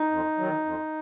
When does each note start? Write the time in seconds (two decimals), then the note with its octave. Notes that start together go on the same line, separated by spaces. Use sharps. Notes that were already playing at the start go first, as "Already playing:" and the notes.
Already playing: D#4
0.11 F2
0.38 D#3 F#3
0.65 F2